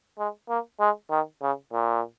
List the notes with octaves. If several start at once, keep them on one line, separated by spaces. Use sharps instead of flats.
G#3
A#3
G#3
D#3
C#3
A#2